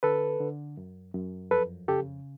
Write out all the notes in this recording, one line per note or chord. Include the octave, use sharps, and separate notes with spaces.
D3 A4 B4
D3
F#2
F#2
F2 A4 B4
C#3 G4 A4